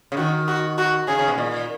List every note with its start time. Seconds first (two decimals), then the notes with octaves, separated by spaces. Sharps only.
0.12 C#3
0.17 D#3 F#4
0.48 F#4
0.78 F#4
1.08 C#3 G#4
1.19 C#3
1.28 B2
1.38 A#2